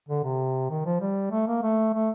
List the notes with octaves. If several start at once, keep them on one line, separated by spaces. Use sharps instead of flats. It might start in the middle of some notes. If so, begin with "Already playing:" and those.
D3
C3
D#3
F3
G3
A3
A#3
A3
A3